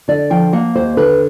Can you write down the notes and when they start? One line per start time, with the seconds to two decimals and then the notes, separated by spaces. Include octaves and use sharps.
0.08 D3 D5
0.30 F3 G5
0.53 A#3 F#5
0.76 D#2 C5
0.97 D3 B4